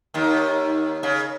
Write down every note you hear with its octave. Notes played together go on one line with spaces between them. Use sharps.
D#2 D#3
C#3